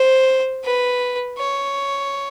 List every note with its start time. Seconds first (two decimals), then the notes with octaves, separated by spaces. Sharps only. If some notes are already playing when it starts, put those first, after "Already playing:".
Already playing: C5
0.64 B4
1.39 C#5